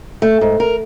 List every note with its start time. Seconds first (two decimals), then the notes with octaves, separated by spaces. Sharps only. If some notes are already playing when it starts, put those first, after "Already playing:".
0.22 A3
0.41 G#2
0.60 A#4